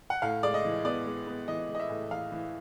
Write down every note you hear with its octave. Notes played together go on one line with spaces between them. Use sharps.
F#5
A2 F5
G#3 D5
D#5
E3
B3 D5
G#3
B3
E3 D#5
G#3
D#5
E5
A2
E3 F5
E3